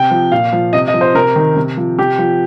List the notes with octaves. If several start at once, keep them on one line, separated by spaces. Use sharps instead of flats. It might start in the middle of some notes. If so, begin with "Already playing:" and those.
Already playing: C3 G5
F3
A#2 F5
F3
C3 D#5
D#5
F3
C5
C3 A#4
D#3
C3
F3
C3 G4
F3